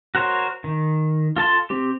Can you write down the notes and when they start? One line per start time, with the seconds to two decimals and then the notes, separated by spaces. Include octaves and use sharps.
0.15 F#4 A#4 C5 C#5
0.64 D#3
1.36 F4 A4 A5 C6
1.70 C4 G4